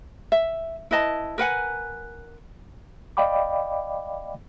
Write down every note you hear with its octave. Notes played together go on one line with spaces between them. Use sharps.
E5
E4 B4 D#5 A5
A#4 B4 F#5 G#5
D5 D#5 F5 G5 B5 D6